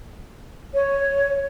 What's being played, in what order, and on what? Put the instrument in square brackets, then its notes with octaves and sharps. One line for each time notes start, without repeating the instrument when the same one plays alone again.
[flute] C#5